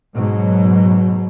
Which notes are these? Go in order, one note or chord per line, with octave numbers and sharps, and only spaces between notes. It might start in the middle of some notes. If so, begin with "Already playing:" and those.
G#2 B2 F#3